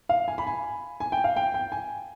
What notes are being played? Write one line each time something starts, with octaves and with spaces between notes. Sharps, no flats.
F5
G#5
B5
G#5
G#5
G5
F5
G5
G5
G#5